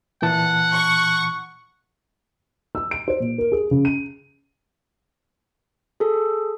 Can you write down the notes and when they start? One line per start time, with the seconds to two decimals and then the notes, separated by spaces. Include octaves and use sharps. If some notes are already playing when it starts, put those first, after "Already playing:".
0.22 A#2 E3 F#5 A5
0.73 C#6
2.75 E6
2.91 D7
3.08 C5
3.20 A#2
3.38 A#4
3.52 G#4
3.71 C#3
3.85 D#7
6.00 G#4 A4